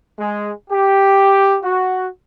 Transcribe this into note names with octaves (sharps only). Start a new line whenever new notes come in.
G#3
G4
F#4